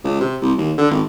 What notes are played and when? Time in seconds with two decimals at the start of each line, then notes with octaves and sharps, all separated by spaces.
0.04 C#2
0.20 C3
0.42 C2
0.58 D#2
0.78 D3
0.91 G#1